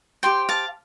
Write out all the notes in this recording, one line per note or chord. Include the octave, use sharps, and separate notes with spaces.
G4 C5 G5 C6
F5 A5